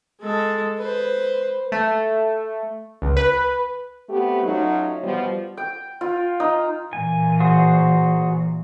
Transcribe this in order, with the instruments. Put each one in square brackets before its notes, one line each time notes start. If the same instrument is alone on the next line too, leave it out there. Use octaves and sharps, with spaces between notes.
[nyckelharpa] G#3 A4
B4 C5
[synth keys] A3
C#2
B4
[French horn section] A3 B3 C4 G4
F#3 A3 C#4 D#4 F4 F#4
B2 F3 G3
[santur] G5
F4
D#4
[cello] A#2 E3 [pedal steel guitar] G#5
[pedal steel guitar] F#4 G#4 C5